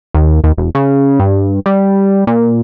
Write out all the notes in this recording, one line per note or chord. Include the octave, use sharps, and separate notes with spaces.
D#2
D#2
E1
C#3
G2
G3
A#2